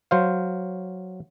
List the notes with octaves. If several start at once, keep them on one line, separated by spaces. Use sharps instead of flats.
F#3 C5 F5